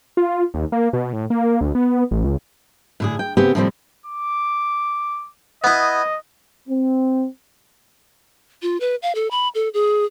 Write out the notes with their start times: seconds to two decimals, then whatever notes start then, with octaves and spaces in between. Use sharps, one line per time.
0.17 F4
0.54 D#2
0.72 A#3
0.93 B2
1.13 A2
1.30 A#3
1.61 D2
1.75 B3
2.11 A1
2.24 C#2
3.00 A2 D3 G#4
3.19 G5
3.37 C#3 B3 C4 G4
3.55 A2 C3 F3 G3 A3 C4
4.06 D6
5.64 B3 E4 D#5
6.68 C4
8.62 F4
8.80 B4
9.02 F5
9.15 A4
9.31 B5
9.55 A4
9.74 G#4